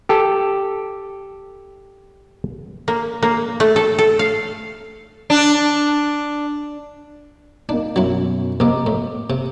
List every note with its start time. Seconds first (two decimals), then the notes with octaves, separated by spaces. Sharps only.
0.09 G4 A4
2.88 A#3
3.23 A#3
3.60 A3
3.76 A4
3.98 A4
4.19 F5
5.30 D4
7.69 A#3 D4 D#4
7.96 F#2 B2 F#3 E4
8.60 A#1 C3 D#5 A#5 D6
8.86 A2
9.30 C3